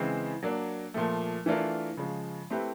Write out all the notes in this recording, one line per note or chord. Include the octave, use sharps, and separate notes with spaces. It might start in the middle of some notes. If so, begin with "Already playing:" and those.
Already playing: C#3 E3 G#3 C4
F#3 A#3 D4
A#2 F3 A3
E3 A3 D4 F4 A#4
C#3 F3 G#3
A3 C4 E4 G4 B4